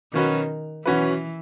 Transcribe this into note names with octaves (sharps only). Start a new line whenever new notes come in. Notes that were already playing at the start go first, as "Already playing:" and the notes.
B2 D#3 F#3 C#4 F#4 B4
B2 E3 F#3 C#4 F#4 B4